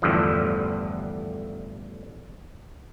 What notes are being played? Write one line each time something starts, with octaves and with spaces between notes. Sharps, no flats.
A1 E2 G2 D3 F3